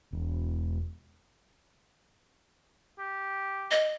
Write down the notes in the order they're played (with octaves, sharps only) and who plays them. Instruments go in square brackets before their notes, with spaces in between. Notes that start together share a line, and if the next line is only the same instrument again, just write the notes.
[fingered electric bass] E1
[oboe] G4
[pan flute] D#5